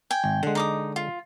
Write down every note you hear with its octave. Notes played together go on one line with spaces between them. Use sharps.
G5 G#5
G#1
D3 G#3 F#5
D#4 D6 D#6
F4